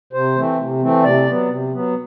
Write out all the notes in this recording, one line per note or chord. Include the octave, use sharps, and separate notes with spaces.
C3 C5
E3 A3 C4
C3
E3 A3 C4
C3 D5
F#3 B3
C3
F#3 B3